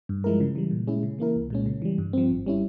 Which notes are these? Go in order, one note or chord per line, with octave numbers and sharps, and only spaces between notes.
G2
F3 G#3 E4 A#4
C#3
E3 G3
A#2
G#3 C#4 E4 G#4
C#3
E3 A#3 E4 A#4
C2
A#2 G#3 C#4
C#3
E3 G3
G2
F3 C4
G#1
G3 C#4 E4